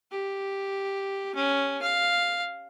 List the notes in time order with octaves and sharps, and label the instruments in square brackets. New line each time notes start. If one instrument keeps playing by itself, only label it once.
[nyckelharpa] G4
C#4
F5